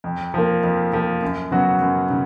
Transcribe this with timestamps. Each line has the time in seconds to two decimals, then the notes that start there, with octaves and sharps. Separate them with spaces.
0.04 F2
0.34 F3 A#3
0.63 F2
0.93 F3 A#3
1.23 F#2
1.51 C#3 F#3 B3 F#4
1.81 F#2
2.10 C#3